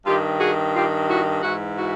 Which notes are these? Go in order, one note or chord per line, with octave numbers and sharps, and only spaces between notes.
G2 D#3 F4 G4
F#4 G#4
F4 G4
E4 F#4
G#2 E3 E4 F#4
E4 F#4